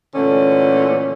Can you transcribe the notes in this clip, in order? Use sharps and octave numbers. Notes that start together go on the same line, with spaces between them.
A#2 D3 E3 A3 C#4